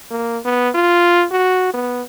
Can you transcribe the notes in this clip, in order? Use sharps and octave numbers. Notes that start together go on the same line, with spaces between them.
A#3
B3
F4
F#4
B3